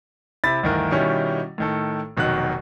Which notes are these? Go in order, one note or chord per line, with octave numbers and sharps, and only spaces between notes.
C3 E4 B5 A6
D2 G2 D#3 E3 A#4
B2 D#3 G3 C#4 E4
A2 D#3 A4
F1 B2 D#3 F#3 F#4 F#6